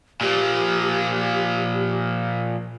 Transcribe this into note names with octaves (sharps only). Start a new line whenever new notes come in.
A#2 F3 G4